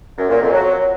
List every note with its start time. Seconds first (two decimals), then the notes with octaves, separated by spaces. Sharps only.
0.18 F#2
0.30 A#2
0.41 F2
0.53 F#3